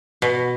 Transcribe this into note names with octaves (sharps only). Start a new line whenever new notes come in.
B2